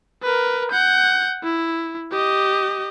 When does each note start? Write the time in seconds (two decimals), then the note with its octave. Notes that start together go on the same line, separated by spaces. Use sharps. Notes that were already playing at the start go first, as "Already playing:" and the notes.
0.23 A#4 B4
0.71 F#5 G6
1.43 E4
2.12 G4 D#5